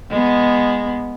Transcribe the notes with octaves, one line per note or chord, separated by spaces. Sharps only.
G#3 B3